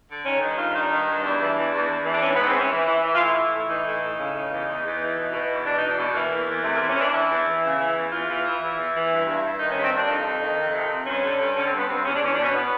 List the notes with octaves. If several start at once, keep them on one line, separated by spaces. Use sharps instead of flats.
D3
D#3 C#4
G2 D#4
D#3 F4
D#3 D#4
D4
G2 D#4
G2
E2 D4
E3
E2
E2
E2
E3
D4
G#2 C#4
G#2 B3
C4
E3 C#4
E3
E3
E3
F4
A2 E4
E3
A2
E4
E3 D#4
A2
A2
C#3
C#3
E2
E2
E2
E3
B2
B2
E2
B2 D4
E2 D#4
D4
B2
E3 A#3
E2
E2
C3 A3
E3 A#3
C#4
E3 D4
E3 E4
E2
E3
C#3
E3
E2
E2 F4
E3
E3
E2 E4
E2
E3
G2
G2
G2
D#3 D#4
G2 C#4
C4
G2 D4
F2 D#4
F2
D#3
F2
C3
C3
G2 C#4
D3
G2
D3 C#4
C4
G2 B3
G2 C4
E2 C#4
D4
E2 C#4
B2 D4
C#4
B3